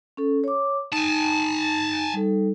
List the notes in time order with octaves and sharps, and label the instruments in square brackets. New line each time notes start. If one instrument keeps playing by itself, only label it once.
[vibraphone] C#4 A4
C#5 D6
[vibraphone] D#4 [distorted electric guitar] G#5 A5
[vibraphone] G3 D#4 A4